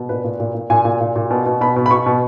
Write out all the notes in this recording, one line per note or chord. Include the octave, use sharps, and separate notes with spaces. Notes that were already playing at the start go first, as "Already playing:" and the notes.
Already playing: B2
A#2 B4
A#2
A#2
A#2
A#2 G#5
A#2
A#2
A#2
B2
B2
B2 B5
B2
B5
B2 C#6
B2